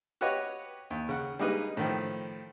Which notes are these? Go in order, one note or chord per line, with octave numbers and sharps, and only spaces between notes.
F#4 G4 B4 C#5 D#5
D#2
C#3 F#5
G3 G#3 A#3 D#4 B4
A2 D#3 F3